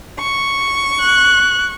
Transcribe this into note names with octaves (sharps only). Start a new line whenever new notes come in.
C#6
F#6